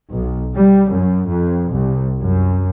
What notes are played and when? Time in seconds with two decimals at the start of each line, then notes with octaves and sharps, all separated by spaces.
0.11 B1
0.56 G3
0.91 F#2
1.29 F2
1.72 C2
2.19 F#2